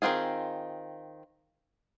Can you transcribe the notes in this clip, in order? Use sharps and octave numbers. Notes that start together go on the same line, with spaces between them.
D#3 A#3 C4 F4 G#4